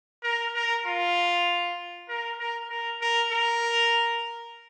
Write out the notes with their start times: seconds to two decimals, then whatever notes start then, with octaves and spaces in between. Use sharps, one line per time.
0.23 A#4
0.55 A#4
0.86 F4
2.09 A#4
2.39 A#4
2.70 A#4
3.01 A#4
3.31 A#4